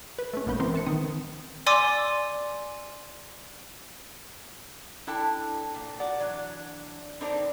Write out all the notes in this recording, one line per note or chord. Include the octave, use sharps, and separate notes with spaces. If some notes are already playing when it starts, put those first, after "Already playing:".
B4
A3 C#4
A#1 G#3 A#3 B3 B4 G6
E3 B3 C4 E4 A#4 C5
E3 A5 C#7
D#3 C4 D#6
D5 G#5 C6 D6 E6
D4 E4 A4 G5 A5
A#2
F#4 A#4 D5 F#5
E3 F#3 D4
D3 G3 C4 D4 D#4 A#4